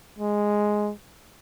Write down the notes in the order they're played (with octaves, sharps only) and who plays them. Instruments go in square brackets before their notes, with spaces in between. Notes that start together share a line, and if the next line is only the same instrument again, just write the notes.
[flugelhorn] G#3